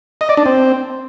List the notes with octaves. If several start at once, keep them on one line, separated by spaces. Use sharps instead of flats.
D#5
D5
D4
C4